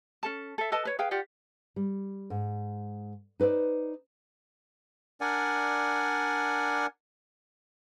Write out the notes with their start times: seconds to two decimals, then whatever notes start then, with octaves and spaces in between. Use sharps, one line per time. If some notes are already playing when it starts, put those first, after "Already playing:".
0.23 C#4 A4 A5
0.58 A4 E5
0.72 A4 B4 D#5 A5
0.85 B4 C#5
0.99 G#4 B4 F5 G5
1.11 F4 G4 D5 F#5
1.76 G3
2.30 G#2
3.40 D#4 B4 C5 D5
5.21 D4 A#4 D5 F#5 G#5